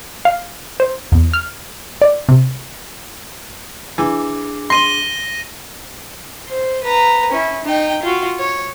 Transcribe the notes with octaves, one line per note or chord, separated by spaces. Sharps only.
F5
C5
E2
F6
D5
C3
E3 D4 G#4 D6
C6 A#6 D#7 G7
C5
B4 A#5
C#4 E4
D#4 G5
F4 F#4
C#5